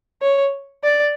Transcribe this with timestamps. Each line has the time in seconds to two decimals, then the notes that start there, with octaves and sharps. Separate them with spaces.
0.22 C#5
0.84 D5